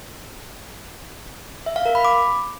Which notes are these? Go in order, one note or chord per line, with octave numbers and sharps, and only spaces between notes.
E5
F5
A#4
B5
D6